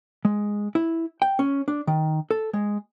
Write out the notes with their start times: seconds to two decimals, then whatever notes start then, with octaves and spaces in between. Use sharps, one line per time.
0.25 G#3
0.75 E4
1.22 G5
1.39 C#4
1.68 D4
1.87 D#3
2.31 A4
2.53 G#3